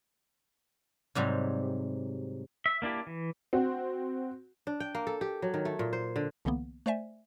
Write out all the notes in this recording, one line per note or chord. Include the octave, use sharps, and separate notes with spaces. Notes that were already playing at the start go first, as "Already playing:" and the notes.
G#2 C3 F#3 G3
E5
A#3 D4 E4 G4
E3
C4 F#4
D4
G5
A#3
A4
G4
F#3
D#3
A3
A#2
C5
D3
C2 D3 E3 A#3 B3
A3 C5 D5 E5 G#5